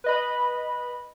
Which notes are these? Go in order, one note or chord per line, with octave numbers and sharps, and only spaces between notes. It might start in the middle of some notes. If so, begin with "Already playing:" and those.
B4 D#5 B5